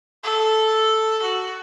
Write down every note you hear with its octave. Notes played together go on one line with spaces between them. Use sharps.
A4
F#4